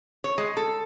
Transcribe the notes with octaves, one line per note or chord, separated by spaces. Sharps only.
C#5
G#3
A4